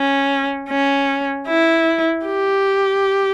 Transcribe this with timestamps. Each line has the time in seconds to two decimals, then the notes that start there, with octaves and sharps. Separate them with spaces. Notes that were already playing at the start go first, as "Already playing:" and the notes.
Already playing: C#4
0.69 C#4
1.47 E4
2.26 G4